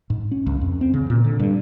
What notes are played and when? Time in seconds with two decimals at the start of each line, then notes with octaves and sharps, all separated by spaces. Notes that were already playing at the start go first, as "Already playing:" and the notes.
0.10 G#2
0.31 C#4
0.46 C#2
0.61 F2
0.81 C4
0.94 C#3
1.10 A#2
1.24 D3
1.40 G2